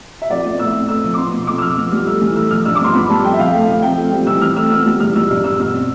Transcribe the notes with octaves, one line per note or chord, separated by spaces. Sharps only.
E5
F2 D5
B3
A2 E6
C4
A3 E6
F3
D6
B3 C6
B2
F2 D6
E6
F3 F6
B3
G3
A3 E6
E3
A3 E6
F3 F6
G2 E6
D6
B3 C6
B3 B5
G3 A5
F2 G5
E5
F3 F5
A3
F3
C4 G5
A3
G3
E3 E6
C4 F6
A3 E6
B3 E6
G3
E2 F6
G3 E6
G2 F6
B3 E6
B2 E6
C4